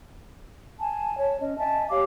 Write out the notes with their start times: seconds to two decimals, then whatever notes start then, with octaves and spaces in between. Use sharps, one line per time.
0.79 G#5 A5
1.18 C#5 A5
1.40 C#4 D#5
1.58 D#5 E5 G#5 A5
1.90 G4 C#5 F5 D6